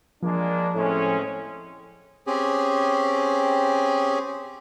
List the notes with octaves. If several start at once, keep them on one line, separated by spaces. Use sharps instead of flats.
F3 G#3 A#3 D4
A2 G#3 C4 C#4
C4 C#4 G4 G#4